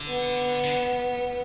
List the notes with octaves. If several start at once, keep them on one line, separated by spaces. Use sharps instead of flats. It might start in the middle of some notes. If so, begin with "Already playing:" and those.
Already playing: D3
B3
D3